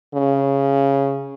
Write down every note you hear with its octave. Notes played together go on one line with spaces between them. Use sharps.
C#3